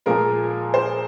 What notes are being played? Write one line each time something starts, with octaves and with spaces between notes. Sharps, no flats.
A#2 F3 G#3 A#4
C5